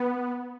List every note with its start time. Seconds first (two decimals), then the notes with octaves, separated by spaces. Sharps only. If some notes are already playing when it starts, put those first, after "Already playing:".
Already playing: B3